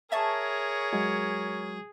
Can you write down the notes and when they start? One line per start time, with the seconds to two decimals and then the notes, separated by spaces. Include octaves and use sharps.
0.12 G#4 A#4 C#5 E5 A5 C#6
0.93 F#3 G#3 F#4